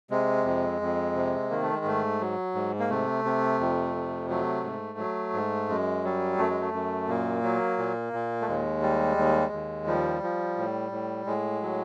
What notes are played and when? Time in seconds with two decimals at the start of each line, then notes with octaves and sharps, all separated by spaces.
0.10 C3 G#3
0.45 F2
0.81 F2
1.15 C3
1.50 D#3 A#3
1.63 A3
1.75 G#3
1.85 G#2 A3
2.21 F#3
2.55 G#2
2.80 A#3
2.90 C3 A3
3.25 C3
3.60 F2
3.95 C3
4.29 F#3 A3
4.64 G#2
4.99 F#3
5.33 G#2
5.69 F#2 G#3
6.04 F#3 G3
6.38 F#2 A3
6.50 G#3
6.61 A3
6.73 F#2
7.08 A#2 A#3
7.43 F#3
7.78 A#2
8.13 A#2
8.41 A3
8.48 D#2 G#3
8.82 G3
9.17 D#2
9.52 D#2
9.87 F3 G3
10.23 F3
10.58 A2
10.92 A2
11.26 A2 G#3
11.62 F#3